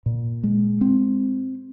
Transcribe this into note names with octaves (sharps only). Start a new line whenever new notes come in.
A#2
G#3
C4